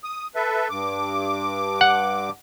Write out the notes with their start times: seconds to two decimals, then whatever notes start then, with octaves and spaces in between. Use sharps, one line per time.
0.04 D#6
0.35 A4 B4 E5
0.70 G2 D6
1.81 F#5